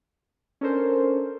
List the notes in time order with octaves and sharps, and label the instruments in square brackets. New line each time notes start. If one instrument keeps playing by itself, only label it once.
[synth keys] C#4 D4 A4 A#4 C5